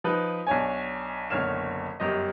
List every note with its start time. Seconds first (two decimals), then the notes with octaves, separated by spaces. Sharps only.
0.04 F3 D#4 B4 B5
0.47 B1 D4 C#5 G#5
1.30 F#1 B1 D3 C#5 F6 E7
2.00 G1 F#2 G4 D#5